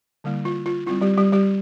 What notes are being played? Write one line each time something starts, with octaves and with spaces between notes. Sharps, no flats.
D3 G3 A#3 E4
F4
F4
G3 C4 E4 F4
G3 G4
G3 G4
G3 G4